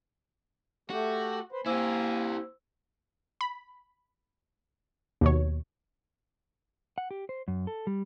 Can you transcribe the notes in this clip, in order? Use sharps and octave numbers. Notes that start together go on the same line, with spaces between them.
A3 F#4 G4
B4 C5
A#3 E4 G4 C5 G#5 E6
B5
D#2 B2 C#5
F#5
G4
C5
F#2
A4
G3